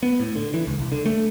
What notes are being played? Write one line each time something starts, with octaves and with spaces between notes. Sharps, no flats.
B3
A2
D3
E3
C#2
C2
D3
A3